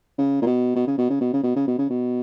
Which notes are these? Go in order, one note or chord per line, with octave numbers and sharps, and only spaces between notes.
C#3
A#2
B2
B2
C#3
B2
C#3
B2
C#3
B2
C#3
B2
C#3
B2